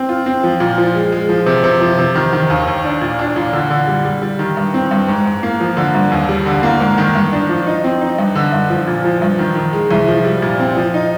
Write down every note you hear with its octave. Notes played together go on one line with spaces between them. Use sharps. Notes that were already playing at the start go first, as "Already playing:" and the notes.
Already playing: C4
F4
C4
F3
A#2
F3
G#3
G#3
F3
C3
C3
F3
C3
D#3
D#3
D#2
D#2
D4
A#2
D4
A#2
D3
D3
G3
G3
G3
D#3
G2
C4
G2
G#2
G#2
A#3
F3
D3
G2
D#2
G3
D3
A#3
G#2
D#3
G2
D4
F3
D#4
C4
D#4
G2
D3
G2
F3
A#2
F3
G2
D#3
D#3
G#3
C2
F3
G3
A#2
C4
F3
D#4